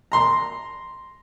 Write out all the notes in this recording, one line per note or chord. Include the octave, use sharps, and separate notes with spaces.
A#5 C6